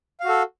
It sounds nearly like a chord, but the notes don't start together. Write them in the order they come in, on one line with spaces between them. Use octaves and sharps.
F5 F#4 A4